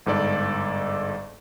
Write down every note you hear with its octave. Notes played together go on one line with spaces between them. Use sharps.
G1 G#2 A4 D5